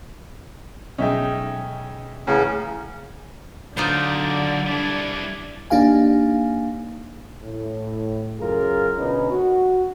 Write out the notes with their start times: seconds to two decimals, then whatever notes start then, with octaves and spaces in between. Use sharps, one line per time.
0.98 B1 G#3 C#4 D#4 D#5 E5 G5
2.27 A2 C#3 E3 C#4 F#5 A#5 C7
3.77 D3 F#3 D#4 F4 C5 D5
4.66 G3 D4 E4
5.70 A#3 D4 D#4 G4 F5 G#5
7.43 A2
8.38 C#2 F#2 F4 G#4 A#4
8.98 D2 B2 C#4 D#4 B4
9.30 F#4